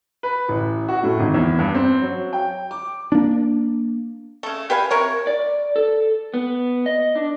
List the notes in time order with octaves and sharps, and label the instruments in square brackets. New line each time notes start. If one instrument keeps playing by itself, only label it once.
[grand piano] B4
A1
F#4
A2
G#1
E2
G2
C4
F#3
G5
D6
[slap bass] A#3 D4
[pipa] C#3 A3
G4 B4 F5 G#5
C3 A#4 C#5
[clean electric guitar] D5
A4
B3
D#5
D4